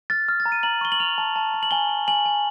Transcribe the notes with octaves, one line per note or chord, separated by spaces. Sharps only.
F6 A6
F6
A6
A#5
D#7
A#5 F#7
C#6 G7
F#7
F6 F7
A5
A5
A5
F#7
G#5 G7
G#5
G#5 F#7
G#5